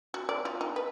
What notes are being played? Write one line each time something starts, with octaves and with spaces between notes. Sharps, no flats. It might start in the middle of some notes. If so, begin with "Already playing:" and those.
F#4
D5
F4
D#4
B4